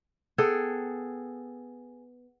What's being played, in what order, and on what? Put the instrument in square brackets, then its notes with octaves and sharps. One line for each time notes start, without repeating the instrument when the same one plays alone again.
[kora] B3 G#4 A4 G5